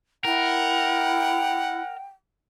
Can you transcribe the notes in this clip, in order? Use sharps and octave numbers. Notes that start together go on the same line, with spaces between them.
E4 A#4 F#5 G5